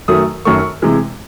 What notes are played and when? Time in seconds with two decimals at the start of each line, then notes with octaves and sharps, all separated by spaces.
0.08 F#2 D#3 F#3 A3 D#6
0.45 F#2 D#3 A3 C#6
0.82 C3 E3 G#3